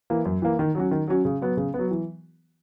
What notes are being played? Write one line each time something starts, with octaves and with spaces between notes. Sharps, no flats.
E3 A#3
F#2
E3 A#3
D#3
F#3 C#4 F#4
D#3
F#3 C#4 F#4
C#3
F#3 B3
C#3
B3
F#3
E3